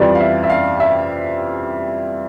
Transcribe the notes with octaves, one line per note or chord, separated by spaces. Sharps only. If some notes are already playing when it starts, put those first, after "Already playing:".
Already playing: F2 E3 G3 D5
F5
E5
E5
F5
E5